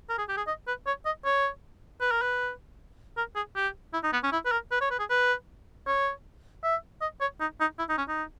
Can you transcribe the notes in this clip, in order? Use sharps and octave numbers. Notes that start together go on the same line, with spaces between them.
A#4
G#4
G4
G#4
D#5
B4
C#5
D#5
C#5
B4
A#4
B4
A#4
G#4
G4
E4
D#4
B3
C#4
E4
B4
A#4
B4
C#5
B4
G#4
B4
C#5
E5
D#5
C#5
D#4
D#4
E4
D#4
C#4
D#4